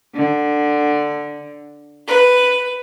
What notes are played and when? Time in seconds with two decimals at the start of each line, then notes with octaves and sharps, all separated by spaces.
0.14 D3
2.07 B4